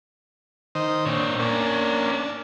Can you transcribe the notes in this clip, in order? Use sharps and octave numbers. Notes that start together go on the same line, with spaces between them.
D#3 C5 D#5
A#2 C4 D4 C#5
A#3 C#4 D4 D5
D4